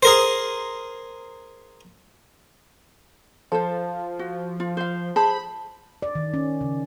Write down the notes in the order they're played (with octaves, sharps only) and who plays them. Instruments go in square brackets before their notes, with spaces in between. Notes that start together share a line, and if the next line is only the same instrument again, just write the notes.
[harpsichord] G#4 A#4 C5
[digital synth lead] F3 [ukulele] A4 C5
[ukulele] F#4
F4
C5 F5
[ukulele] G#4 C5 A5 [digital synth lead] B5
[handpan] D5
D#3
C#4
C#3